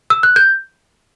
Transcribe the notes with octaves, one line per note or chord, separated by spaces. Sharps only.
E6
F#6
G6